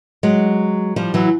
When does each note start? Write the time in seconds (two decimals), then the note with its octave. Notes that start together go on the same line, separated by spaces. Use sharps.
0.23 F#3 G#3
0.96 F3 G3
1.14 E3 F#3